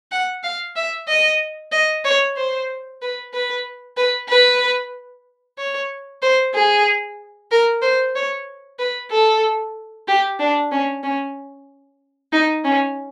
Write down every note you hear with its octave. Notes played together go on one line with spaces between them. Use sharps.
F#5
F5
E5
D#5
D#5
C#5
C5
B4
B4
B4
B4
C#5
C5
G#4
A#4
C5
C#5
B4
A4
G4
D4
C#4
C#4
D#4
C#4